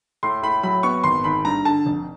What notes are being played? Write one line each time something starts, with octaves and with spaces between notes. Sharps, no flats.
A2 C6
A2 B5
F#3 B5
B3 C#6
G#1 C6
G#1 B5
G2 A#5
D3 A5
F1